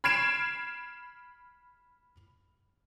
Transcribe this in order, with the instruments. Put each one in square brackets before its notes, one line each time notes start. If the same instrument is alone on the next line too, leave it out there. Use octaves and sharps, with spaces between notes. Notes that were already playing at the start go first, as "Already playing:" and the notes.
[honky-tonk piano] B5 F6 G#6 C7 D7 E7